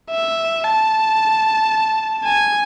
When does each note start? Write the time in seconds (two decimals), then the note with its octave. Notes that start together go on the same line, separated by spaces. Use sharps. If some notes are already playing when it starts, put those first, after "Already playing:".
0.11 E5
0.64 A5
2.25 G#5